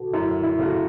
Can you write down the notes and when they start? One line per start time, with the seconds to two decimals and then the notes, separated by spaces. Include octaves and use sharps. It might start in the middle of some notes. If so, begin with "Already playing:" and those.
Already playing: F#4 A4 B4
0.14 F#2 E4
0.44 E4
0.58 C#3 A3 F#4